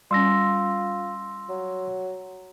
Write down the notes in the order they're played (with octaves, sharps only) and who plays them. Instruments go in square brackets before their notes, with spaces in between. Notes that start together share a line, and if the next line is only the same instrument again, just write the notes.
[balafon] G3 C#4 [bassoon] F4 [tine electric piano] C6 E6 A#6
[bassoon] F#3